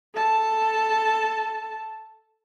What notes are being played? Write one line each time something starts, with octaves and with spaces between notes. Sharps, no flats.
A4 A5